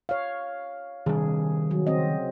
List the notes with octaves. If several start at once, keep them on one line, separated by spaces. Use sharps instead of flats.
C#5 F5
C3 D#3 G3 D4 G#4
F#3
C#3 C4 D#5